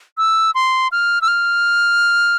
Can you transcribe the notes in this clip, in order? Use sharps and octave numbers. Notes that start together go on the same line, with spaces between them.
E6
C6
F6
E6
F6